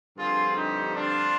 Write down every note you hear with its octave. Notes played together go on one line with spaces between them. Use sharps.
G2 D3 F3 C4 F4 G#4
D#4 G4
D4 F4